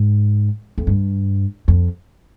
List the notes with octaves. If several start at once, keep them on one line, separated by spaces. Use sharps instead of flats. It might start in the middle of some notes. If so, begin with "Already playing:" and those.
Already playing: G#2
F2
G2
F2